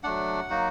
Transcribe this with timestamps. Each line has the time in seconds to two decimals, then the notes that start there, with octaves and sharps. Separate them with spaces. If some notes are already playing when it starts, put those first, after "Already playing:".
0.04 F#3 A3 D4 F#5
0.50 F#3 A#3 D#4 F#4